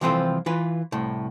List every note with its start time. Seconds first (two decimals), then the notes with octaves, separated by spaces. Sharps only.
0.01 C2 E3 F3 C4 F4 A4
0.46 E3 F4 B4
0.92 C2 A2